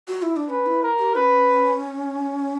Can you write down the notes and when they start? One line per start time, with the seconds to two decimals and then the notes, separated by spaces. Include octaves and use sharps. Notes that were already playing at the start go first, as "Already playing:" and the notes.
0.08 F#4
0.22 E4
0.36 D4
0.49 C#4 B4
0.66 E4
0.83 A#4
0.99 G4
1.15 C#4 B4